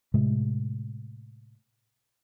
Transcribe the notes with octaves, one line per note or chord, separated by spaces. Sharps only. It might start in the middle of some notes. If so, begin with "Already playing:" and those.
A2 C3 G#3 A3